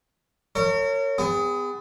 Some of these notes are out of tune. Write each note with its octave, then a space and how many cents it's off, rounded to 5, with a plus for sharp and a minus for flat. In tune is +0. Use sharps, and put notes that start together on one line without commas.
A#4 -35 C#5 +0
B3 +30 G#4 -35